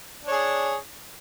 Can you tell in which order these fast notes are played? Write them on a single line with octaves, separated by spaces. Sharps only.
D4 C#5 G#4